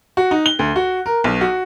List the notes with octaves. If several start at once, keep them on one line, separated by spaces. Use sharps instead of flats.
F#4
D#4
G7
D2
F#4
A#4
B1
F#4